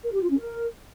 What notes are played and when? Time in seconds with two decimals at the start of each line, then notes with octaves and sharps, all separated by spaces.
0.04 A#4
0.13 G4
0.21 F4
0.30 C#4
0.39 A#4